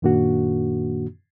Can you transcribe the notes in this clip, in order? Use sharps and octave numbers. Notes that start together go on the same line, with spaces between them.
F#2 A#2 D#3 A#3 D4 F#4